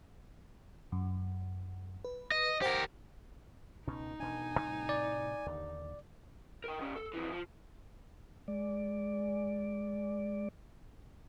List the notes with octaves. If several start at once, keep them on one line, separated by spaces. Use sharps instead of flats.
F#2
B4
D#5
G4 A#4 C5 F#5 G5
C#2 B2 C#4 D#4
E1 B2 D4 G#5
A2 C3 G3
D5
D#2 D3
A#4 G5
D#3 C#4
A4
F2 E3
F3
G#3 D5